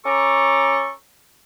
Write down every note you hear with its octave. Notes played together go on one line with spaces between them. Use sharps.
C#4 A4 A#5 C#6 D6